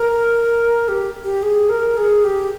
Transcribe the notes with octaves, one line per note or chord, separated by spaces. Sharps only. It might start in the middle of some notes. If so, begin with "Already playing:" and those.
Already playing: A#4
G4
G4
G#4
A#4
G#4
G4